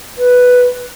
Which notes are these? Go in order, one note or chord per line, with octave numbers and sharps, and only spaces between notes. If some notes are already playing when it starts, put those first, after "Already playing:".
B4